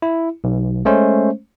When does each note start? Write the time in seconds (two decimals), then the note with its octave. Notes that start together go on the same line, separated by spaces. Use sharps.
0.02 E4
0.44 B1
0.85 G#3 A3 C#4 C5